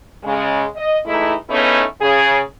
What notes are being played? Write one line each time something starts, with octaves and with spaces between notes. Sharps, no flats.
C#3 G#3
D#5
E3 G#3 A3 D#4 E4
C#3 A3 B3 C#4 D#4 E4
C#3 G#4